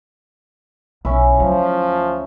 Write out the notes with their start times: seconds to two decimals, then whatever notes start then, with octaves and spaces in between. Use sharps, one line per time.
1.05 B1 C#4 E4
1.40 D2 F3 F#3